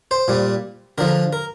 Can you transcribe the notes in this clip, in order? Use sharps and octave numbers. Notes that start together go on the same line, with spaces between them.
C5
A#2 G3
D3 F3 A#4
A#4